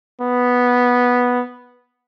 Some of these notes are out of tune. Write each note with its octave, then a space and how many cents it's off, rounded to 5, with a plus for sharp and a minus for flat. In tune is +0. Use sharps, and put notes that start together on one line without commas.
B3 -5